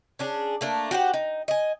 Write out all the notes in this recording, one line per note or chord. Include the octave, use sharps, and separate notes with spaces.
C#4 D4 G#4
A3 A#3 D4
F#4 G4 C5 F#5
D#4
D#5 G#5